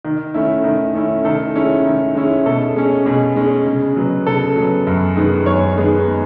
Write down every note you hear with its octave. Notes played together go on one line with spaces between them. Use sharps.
D#3
A3 C#4 E4
D#3
A3 C#4 E4
D#3 A4
G#3 C#4 E4
D#3
G#3 C#4 E4
B2 A4
G#3 C#4
B2 G#4
G#3 C#4
C#3
F#3 B3
C#3 A4
F#3
B3
F#2
D#3 G#3 B3
F#2 C#5
D#3 G#3 B3